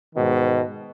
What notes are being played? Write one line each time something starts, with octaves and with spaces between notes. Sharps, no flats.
G#2 B2 D#3